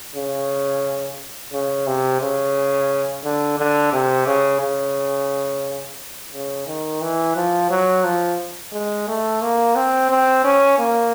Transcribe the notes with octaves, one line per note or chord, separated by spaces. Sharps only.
C#3
C#3
C3
C#3
D3
D3
C3
C#3
C#3
C#3
D#3
E3
F3
F#3
F3
G#3
A3
A#3
C4
C4
C#4
A#3